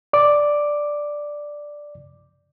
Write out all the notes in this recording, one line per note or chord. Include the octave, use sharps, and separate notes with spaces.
D5 D6